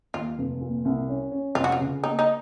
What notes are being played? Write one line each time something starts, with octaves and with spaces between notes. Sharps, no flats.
D#2 F4
F1
A#2
C2
C#4
C#4
F1 F4
F#4
F4
C#3
A#3 D#4
D#4